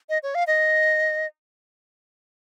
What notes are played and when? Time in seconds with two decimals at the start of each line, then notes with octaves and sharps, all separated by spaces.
0.09 D#5
0.23 C#5
0.35 F5
0.47 D#5